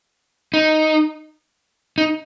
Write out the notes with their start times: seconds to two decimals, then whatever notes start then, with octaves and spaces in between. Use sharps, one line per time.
0.54 D#4
1.98 D#4